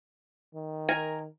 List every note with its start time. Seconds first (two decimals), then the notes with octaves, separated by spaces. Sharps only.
0.55 D#3
0.89 A#4 G#5